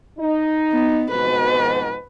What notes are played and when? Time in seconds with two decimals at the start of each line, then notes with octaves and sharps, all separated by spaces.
0.18 D#4
0.72 B3
1.11 F2 G#2 B2 B4